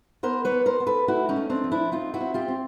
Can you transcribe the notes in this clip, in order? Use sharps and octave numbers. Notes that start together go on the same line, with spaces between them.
B3 A#4 C5
B4 C#5
B3
A#4 C5
B3
A4 B4
A3 E4 F#4
C#4 D#4
A3
C4 D4
F3
D4 E4
C4 D#4 F4
E4 F#4
C4
F4 G4
C4